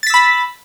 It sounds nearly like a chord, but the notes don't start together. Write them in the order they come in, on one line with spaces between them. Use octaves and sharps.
A6 B6 E6 B5